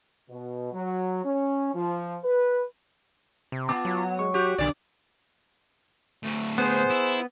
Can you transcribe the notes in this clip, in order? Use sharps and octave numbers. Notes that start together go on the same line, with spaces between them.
B2
F#3
C#4
F3
B4
C3
B3 F4 A5 D6
F#3
G#3 C#6
F#4 G4
B1 D3 D5
D2 A2
B3 G#4 C5
E4